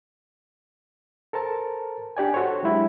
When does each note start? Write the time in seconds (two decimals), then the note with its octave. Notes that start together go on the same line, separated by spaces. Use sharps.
1.33 A4 A#4 C5 A5
2.17 D4 G4 D5 G#5
2.34 F#4 A4 C5 C#5
2.63 F#3 G#3 D4 E4 G4